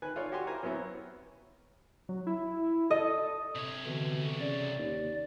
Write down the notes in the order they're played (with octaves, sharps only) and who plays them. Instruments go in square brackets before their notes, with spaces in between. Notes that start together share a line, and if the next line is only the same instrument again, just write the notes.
[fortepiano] D#3 B4 G#5 F#6
F4 A4 C#5 D5
F#4 G4 C#5 G#5 C6 D6
E4 A#4 C5 G#5 A#5
F#2 B3 C4 E4 C#5
[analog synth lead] F#3
E4
[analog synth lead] A4 [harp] D#5
[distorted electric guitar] C3 C#5
[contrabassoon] B2 [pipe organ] D3 E3
[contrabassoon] C#3 [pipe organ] D5
[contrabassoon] D#2